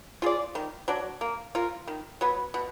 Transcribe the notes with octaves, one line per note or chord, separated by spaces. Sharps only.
F4 G#4 D5
D#3
F#3 D4
A#3
F4 A#4
D#3
F#3 B3
B2